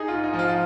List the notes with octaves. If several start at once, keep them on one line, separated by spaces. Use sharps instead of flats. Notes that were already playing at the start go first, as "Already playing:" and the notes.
Already playing: D#4 G#4
G#2 F4
D#4
F3
F4
F4